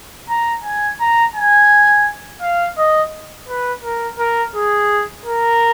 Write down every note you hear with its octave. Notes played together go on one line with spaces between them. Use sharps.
A#5
G#5
A#5
G#5
F5
D#5
B4
A#4
A#4
G#4
A#4